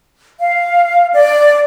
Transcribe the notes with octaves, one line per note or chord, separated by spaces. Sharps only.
F5
D5